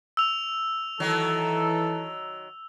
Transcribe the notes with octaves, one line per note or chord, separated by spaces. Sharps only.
E6 F7
D#3 E3 F#3 A4